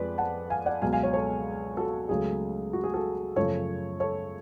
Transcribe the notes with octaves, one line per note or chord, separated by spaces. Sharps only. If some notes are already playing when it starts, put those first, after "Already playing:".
Already playing: F2 F3 G#3 B4 D5
F#5 A5
F5 G#5
D5 F#5
C#2 B2 F#3 F5 G#5
F5 G#5
C#5 F5
A4 C#5
F#4 A4
C#2 C#3 F#3 A3 G#4
F#4
G#4
F#4 A4
F#2 C#3 F3 A3 A4 C#5
A4 C#5